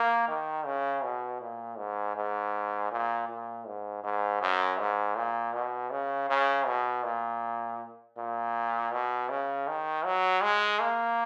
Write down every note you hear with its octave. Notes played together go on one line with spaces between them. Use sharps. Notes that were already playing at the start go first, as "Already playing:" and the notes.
Already playing: A#3
D#3
C#3
B2
A#2
G#2
G#2
A#2
A#2
G#2
G#2
F#2
G#2
A#2
B2
C#3
C#3
B2
A#2
A#2
B2
C#3
D#3
F#3
G#3
A#3